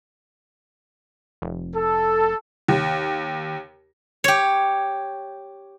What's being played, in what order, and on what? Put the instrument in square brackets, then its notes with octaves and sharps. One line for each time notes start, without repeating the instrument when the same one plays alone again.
[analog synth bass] F1
[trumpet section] A4
[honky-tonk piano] D#2
[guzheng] G4 C#5